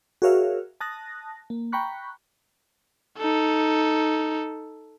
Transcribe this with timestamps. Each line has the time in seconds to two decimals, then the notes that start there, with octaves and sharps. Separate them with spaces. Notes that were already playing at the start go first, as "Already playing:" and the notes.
0.22 F#4 G#4 A#4 C#5 E5 F5
0.81 A5 D#6 F#6 A#6
1.50 A#3
1.72 G5 A#5 B5 C#6 F#6
3.18 D#4 A4